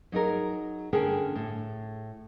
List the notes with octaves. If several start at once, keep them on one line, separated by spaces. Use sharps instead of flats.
F#3 D#4 G#4 A#4
D3 C#4 G#4 A#4 G5
A2